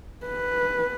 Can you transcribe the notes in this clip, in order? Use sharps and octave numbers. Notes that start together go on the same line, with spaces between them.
B4